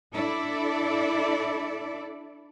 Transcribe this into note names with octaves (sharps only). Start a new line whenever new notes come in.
D4 E4 A4 D5